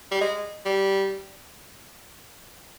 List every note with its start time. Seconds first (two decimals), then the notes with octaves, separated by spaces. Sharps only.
0.11 G3
0.21 G#3
0.65 G3